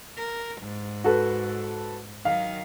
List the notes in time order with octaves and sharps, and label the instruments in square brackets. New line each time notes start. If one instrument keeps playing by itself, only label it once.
[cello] A#4
G#2
[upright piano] F#4 A4 B4
[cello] D#3 F#3 [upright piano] F5